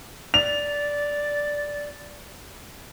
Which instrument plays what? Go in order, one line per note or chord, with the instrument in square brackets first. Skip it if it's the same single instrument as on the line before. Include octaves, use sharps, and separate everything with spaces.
[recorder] D5 [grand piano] F7